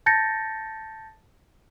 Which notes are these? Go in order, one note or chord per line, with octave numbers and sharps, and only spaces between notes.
A5 G6 A6 A#6 C#7